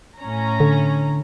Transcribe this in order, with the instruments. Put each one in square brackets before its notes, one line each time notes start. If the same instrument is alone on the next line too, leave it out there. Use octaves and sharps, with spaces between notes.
[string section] A2 C#4 A#5
[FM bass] D3